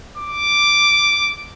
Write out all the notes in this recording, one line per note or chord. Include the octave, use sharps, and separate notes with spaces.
D6